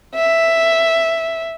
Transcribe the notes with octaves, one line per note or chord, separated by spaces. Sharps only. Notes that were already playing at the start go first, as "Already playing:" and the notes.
E5